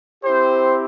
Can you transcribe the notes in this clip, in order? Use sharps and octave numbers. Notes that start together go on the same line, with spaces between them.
C4 E4 G4 C5